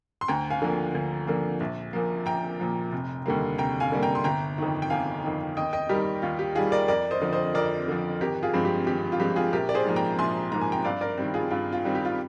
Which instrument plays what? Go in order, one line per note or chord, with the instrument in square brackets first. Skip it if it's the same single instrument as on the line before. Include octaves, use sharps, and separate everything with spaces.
[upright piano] C6
D2 G5 A#5
F5 G#5
D3 F3 A#3
D2
D3 F3 A#3
A#1
A#2 F3 A#3
A#1 G5 A#5
A#2 F3 A#3
F1
D#2 D3 G3 A#3
F1 G5 A#5
F5 G#5
D#2 D3 G3 A#3
G5 A#5
C6
G1 G5 A#5
F2 D#3
G5
G1 F5 G#5
F2 D#3
D#2 D#5 G5
D#5 G5
D#3 G3 G4 A#4
D#2 F4
G4
D#3 G3 F4 G#4
A#4 D5
F2 A#4 D5
C5 D#5
D3 F3
C5 D#5
F2 A#4 D5
D3 F3
G#1 G4 A#4
F4 G#4
G2 F3 G#3 C4
G4
G#1 G4
F4
G2 F3 G#3 C4 G4
F4 G#4
A#1 G4 A#4
D5
G#4 C5
G#2 F3 A#3
G5 A#5
A#1 G#5 C6
G#2 F3 A#3 A#5
G#5
G5 A#5
G2 D5 F5
A#4 D5
D#3 G3 C4
F4 G#4
G2 F4
F4
D#3 G3 C4
G4
F4